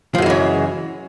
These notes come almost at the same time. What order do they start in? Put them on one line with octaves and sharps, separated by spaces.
F3 F#2 G#3 E3 C#3